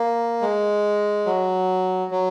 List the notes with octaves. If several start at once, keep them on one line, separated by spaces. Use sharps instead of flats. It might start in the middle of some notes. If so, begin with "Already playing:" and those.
Already playing: A#3
G#3
F#3
F#3